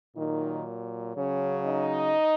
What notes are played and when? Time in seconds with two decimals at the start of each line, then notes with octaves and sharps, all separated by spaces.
0.17 A#2 D#3 F#3 D#4
1.15 C#3 F#3 C#4 C#5
1.65 D#4 D#5